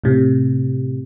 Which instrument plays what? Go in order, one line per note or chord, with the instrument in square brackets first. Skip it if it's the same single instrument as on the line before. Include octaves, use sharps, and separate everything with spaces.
[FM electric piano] A2 C3